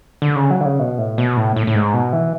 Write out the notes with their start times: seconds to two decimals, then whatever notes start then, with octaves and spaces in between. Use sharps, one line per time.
0.22 D3
0.36 C#3
0.50 F#3
0.61 D3
0.66 C#3
0.79 B2
0.98 A2
1.18 B2
1.37 A2
1.56 A2
1.67 A2
1.75 G#2
1.94 B2
2.13 E3